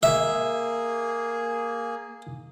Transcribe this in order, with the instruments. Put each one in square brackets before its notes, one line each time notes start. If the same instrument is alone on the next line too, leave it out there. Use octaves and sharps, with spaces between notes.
[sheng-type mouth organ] A#3 G#4 [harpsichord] E5